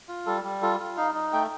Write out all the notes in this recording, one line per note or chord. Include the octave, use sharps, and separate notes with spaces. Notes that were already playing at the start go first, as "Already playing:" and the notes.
F4
G3 A4
G3
F4 A4
F4
D#4 F5
D#4
A3 G5